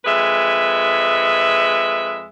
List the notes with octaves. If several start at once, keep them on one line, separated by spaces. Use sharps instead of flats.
F2 G#3 B4 E5